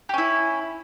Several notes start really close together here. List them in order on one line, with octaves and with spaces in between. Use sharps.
G4 C#4 E4